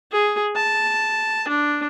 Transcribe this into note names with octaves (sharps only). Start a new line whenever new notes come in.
G#4
A5
D4